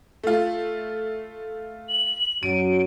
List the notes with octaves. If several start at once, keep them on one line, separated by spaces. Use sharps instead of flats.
A3 F4
F#7
F#2 F#3 D7 D#7